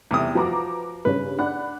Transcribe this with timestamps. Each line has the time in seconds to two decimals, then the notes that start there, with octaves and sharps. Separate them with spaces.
0.11 E2 C3 D#6
0.35 F3 F#4 B4 A#5 D6
1.05 G2 C#3 B4 C#5
1.39 D4 F#5 B5 F#6